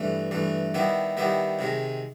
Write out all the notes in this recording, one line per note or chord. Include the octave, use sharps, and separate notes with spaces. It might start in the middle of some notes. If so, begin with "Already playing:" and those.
Already playing: G2 E3 A3
G2 E3 A3
D#3 G3 B3 E4 G4
D#3 G3 B3 E4 G4
C3 D#3 G#3